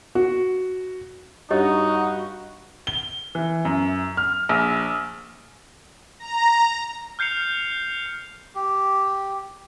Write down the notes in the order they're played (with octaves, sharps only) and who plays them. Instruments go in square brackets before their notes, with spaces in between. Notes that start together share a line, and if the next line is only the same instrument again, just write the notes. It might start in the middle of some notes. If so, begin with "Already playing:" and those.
[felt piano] F#4
[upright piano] G2 [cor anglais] D#4 [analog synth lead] F#4 [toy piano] G4 C#5 D#5
[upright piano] G7
E3
F#2
F6
A#1
[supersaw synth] A#5
[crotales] F6 G6 C7 C#7 F7
[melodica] G4